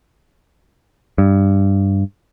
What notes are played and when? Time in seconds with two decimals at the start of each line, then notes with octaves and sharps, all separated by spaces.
1.18 G2